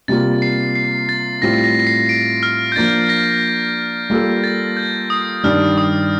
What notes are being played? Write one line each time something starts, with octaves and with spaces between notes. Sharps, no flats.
C3 G3 A#3 F4 A6
C7
C7
A6
A2 G3 C4 F4 A#6
A#6
A#6
C7
D7
F6
G6
F3 A#3 D4 A6
A#6
G3 A#3 F4 A4
A6
G6
D#6
G2 D#3 G3 D4 G4 F6
D#6